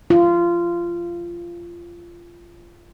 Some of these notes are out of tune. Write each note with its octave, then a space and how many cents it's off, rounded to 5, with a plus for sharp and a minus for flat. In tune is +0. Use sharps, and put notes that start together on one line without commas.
F4 -20